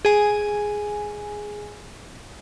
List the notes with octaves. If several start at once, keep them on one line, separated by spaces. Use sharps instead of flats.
G#4 G#5